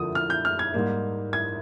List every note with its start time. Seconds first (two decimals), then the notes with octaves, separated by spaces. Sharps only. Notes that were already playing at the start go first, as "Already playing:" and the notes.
Already playing: F2 D3 F3 A#3 D#6
0.15 F6
0.30 G6
0.45 F6
0.59 G#6
0.74 G#2 G3 A#3
1.33 G#6